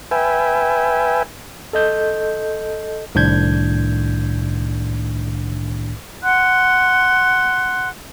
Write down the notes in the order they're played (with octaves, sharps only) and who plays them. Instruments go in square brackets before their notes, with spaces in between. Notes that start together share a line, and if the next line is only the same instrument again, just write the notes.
[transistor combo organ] B4 E5 G5 G#5
[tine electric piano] A4 D#5 G6
C2 A2 D#3 D4 G6 G#6
[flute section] F#5 C6 F#6